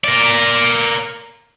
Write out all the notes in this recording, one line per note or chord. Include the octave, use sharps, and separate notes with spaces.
A#4 D5